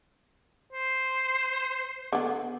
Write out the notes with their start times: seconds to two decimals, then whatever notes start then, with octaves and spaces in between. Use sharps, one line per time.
0.73 C5
2.13 D3 B3